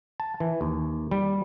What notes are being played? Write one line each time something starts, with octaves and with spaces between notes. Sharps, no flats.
A5
E3
D#2
G3